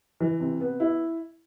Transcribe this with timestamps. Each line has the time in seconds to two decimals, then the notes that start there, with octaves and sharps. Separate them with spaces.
0.20 E3
0.40 C3
0.60 B3
0.80 E4